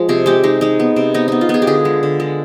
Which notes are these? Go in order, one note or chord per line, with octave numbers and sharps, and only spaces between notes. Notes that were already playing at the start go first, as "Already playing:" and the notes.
Already playing: F3 G#3
C3 G#4
G#3 G4
G#3 D#4
G#3 D#4
B3
C3
B3 D#4
B3 D#4
F4
B3 G#4
G4
D3 G#4
G#3
D3
G#3